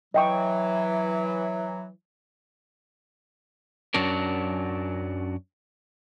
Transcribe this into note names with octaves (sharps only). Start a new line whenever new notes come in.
E3 F#3 D#5 G5 C#6
F#2 F#3 C#4 D4 A#4